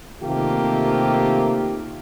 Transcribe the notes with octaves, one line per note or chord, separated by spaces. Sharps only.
C3 D#3 A3 A#3 F4 G4